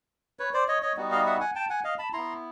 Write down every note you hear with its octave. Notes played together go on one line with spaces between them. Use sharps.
B4 C#5
C5 D5
C#5 D#5
C#5 D#5
G3 B3 D#4 F#4
D#5 F5
E5 F#5
F#5 G#5
G5 A5
F#5 G#5
D#5 F5
A5 B5
B3 E4 A#5 C6